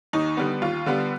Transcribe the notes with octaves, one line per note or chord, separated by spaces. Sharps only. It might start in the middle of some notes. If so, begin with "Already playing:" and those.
D#2 D#4
D3 G3 B3
D#2 F4
D3 G3 B3